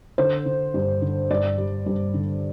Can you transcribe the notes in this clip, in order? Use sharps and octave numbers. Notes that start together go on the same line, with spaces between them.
D3 C5
D3
G2
D3
G2 D5
G3
G2
D3